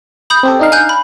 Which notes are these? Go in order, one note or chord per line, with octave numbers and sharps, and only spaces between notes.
B5 D#6 G6
C4 G4 A4
D4 D#4 F5
G#5 F#6 G6
B5